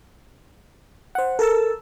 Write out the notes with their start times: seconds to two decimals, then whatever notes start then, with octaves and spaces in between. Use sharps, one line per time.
1.15 C5 F#5
1.39 A4 A#4 A5 E6